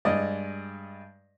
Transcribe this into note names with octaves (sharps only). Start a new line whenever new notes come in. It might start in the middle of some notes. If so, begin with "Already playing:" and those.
G2 G#3 D5 D#5